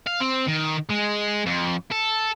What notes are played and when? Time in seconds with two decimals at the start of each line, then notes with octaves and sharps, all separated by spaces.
0.06 F5
0.20 C4
0.47 D#3
0.89 G#3
1.46 F2
1.91 A4